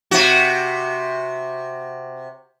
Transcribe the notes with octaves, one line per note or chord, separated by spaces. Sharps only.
C3 F#4